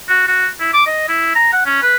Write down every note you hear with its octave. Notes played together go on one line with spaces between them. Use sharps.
F#4
F#4
E4
D6
D#5
E4
A#5
F#5
C#4
B4